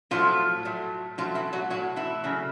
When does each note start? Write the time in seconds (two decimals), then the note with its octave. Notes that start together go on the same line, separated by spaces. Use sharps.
0.11 A2 F3 F#3 A3 F4
0.65 A2 F#3 A3
1.18 A2 F3 F#3 A3 F4
1.35 E3 E4
1.53 F#3 F#4
1.70 A2 F#3 F#4
1.96 E3 E4
2.24 C#3 F#3 A3